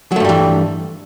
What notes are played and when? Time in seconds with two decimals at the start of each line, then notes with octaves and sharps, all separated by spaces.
0.12 F#3
0.16 A3
0.20 G2
0.25 G3
0.29 E3